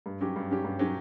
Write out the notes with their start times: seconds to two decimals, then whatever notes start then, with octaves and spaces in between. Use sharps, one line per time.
0.06 G2
0.21 F#3 C#4 G4
0.36 G2
0.51 F#3 C#4 G4
0.64 G2
0.79 F#3 C#4 G4